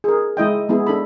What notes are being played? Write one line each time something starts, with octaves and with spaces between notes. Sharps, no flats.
G#4 A#4
G#3 E4 D#5 G5
G#3 B3 E4 G#4
D4 A4 B5